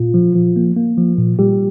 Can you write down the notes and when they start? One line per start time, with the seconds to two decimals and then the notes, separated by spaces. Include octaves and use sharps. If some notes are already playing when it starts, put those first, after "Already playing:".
Already playing: A#2 F4
0.14 F3
0.35 F3
0.56 A#3
0.76 A#3
0.98 F3
1.18 A#2
1.39 A#2 G3 G4